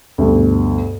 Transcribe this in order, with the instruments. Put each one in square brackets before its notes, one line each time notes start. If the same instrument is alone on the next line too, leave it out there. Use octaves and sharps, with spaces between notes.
[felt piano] D2 G2 B2